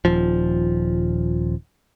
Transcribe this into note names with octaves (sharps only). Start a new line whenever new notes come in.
D#1 F3